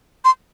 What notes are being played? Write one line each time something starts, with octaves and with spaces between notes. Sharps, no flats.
C6